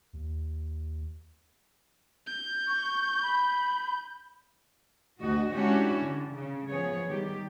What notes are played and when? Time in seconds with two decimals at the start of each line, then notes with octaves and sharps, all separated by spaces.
0.13 D#2
2.26 G6
2.68 C#6
3.22 B5
5.21 D2 F#4 D#5
5.53 G#3 C#4 D4 E4 F#4 G4
5.99 D3
6.33 C#3
6.68 F3 B3 G#4 C#5
7.08 D#3 G3 G4